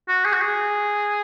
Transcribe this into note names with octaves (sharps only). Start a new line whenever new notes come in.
F#4
G#4
F#4
G#4